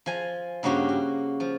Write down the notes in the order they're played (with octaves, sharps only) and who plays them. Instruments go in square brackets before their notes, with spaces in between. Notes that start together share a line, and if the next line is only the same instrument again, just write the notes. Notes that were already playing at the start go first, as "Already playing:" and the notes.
[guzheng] F3 G#5 A#5
G2 C#3 A#3 F#4 G4 A#5
F#4
F3